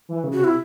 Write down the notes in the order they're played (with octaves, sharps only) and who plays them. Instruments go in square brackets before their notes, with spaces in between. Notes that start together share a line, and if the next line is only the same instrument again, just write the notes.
[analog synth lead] E3
C#3
[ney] F#4
[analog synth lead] C3
[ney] E4